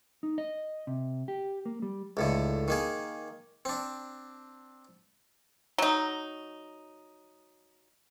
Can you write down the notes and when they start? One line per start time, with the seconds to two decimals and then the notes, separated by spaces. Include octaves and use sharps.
0.23 D#4
0.38 D#5
0.87 C3
1.28 G4
1.66 A#3
1.82 G3
2.17 C#2 A2 D3
2.68 D#3 A#3 G#4
3.65 C4 D4
5.78 F#3 D#4